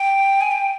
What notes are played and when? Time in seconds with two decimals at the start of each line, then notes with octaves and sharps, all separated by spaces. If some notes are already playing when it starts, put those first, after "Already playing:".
Already playing: G5
0.41 G#5
0.51 G5